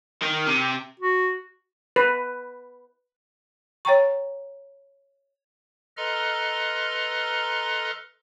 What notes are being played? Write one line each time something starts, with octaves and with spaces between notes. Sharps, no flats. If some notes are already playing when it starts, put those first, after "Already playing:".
D#3
C3
F#4
B4
C#5 G5 A#5 C#6
A4 B4 D#5 A#5 C6 F6